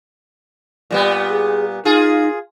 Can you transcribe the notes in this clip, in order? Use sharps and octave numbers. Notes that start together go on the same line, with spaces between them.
A#2 G3 B3
G#4
D#4 F4 G#4